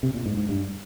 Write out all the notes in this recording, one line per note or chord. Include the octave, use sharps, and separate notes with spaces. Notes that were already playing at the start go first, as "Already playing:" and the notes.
C3
A#2
G#2
G#2
G2